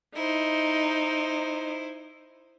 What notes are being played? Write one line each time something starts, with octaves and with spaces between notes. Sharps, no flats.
D#4 E4 C5